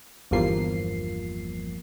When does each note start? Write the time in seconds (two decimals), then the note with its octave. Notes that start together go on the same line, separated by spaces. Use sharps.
0.31 G1 E2 G2 F3 A#3 C7